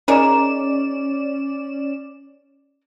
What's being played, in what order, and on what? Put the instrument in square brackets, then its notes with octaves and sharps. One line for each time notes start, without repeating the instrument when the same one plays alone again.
[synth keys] C#4 D5 E7 [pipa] D#4 G#4 A#4